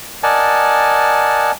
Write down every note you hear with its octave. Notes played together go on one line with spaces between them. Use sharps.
A#4 D5 D#5 F#5 G#5 A5